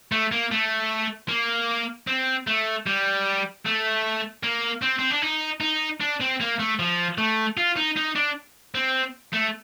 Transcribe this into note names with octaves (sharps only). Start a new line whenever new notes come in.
A3
A#3
A3
A#3
C4
A3
G3
A3
A#3
C4
C4
D4
D#4
D#4
D4
C4
A#3
A3
F3
A3
F4
D#4
D#4
D4
C4
A3